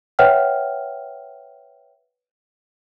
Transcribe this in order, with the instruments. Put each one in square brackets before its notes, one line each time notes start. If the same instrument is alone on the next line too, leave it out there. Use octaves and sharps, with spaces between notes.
[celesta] B4 C#5 E5 F#5 G5 F6